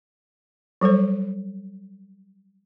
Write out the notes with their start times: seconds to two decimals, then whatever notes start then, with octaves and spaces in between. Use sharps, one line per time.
0.81 F#3 G3 A4 C5